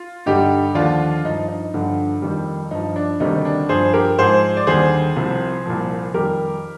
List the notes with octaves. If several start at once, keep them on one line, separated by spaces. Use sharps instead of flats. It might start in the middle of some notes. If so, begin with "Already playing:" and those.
Already playing: F4
G2 D3 G3 D#4 G4
D#2 D3 F3 D4 F4
G2 F3 D#4
D#4
G2 D3 F3
F2 D#3 G3
G2 F3 D#4
D4
D2 C3 D#3 G3 D#4
D4
G2 F3 G#4 C5
G4 A#4
G#2 F3 G#4 C5
D5
D#2 D3 G3 G#4 C5
C2 C3 F3
C2 A#2 F3
F2 D#3 G3 G4 A#4